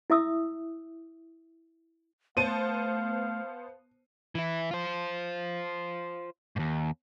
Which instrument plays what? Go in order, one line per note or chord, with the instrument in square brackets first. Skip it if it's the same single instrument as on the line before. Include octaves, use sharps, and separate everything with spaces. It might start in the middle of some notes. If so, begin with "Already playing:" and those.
[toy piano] E4 E5 D#6 E6
[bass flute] A3 [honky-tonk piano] B3 C5 A5 [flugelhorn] F5 [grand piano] D#7
[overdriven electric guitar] E3 E4
F4 C5
D#2 G#2